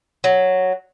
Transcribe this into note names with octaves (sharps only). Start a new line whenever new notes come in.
F#3